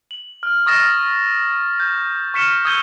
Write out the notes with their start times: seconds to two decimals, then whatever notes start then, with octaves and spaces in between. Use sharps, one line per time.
0.11 F#7
0.43 F6
0.66 C#6 D#6 F6 A6 A#6 E7
1.80 G6
2.34 C#6 F6 B6 C#7 E7 G7
2.65 D#6 E6 G6 G#6 D#7 G7